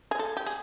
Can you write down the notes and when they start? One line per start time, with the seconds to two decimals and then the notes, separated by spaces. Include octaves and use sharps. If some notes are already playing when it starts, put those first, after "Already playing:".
0.11 G#4
0.19 A4
0.37 G4
0.47 G#4